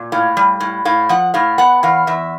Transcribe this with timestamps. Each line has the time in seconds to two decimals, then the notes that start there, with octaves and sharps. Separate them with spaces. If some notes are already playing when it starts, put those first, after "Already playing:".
Already playing: A#2
0.12 A2 F5
0.37 G3
0.60 A2
0.85 A2 F5
1.09 F3 F#5
1.34 A2 F5
1.58 B3 F#5
1.83 E2 F5
2.07 E2 E5